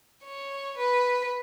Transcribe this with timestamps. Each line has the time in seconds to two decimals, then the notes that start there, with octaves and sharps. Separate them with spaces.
0.25 C#5
0.78 B4